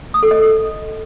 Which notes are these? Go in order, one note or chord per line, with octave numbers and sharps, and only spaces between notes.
D#6
A4
D#5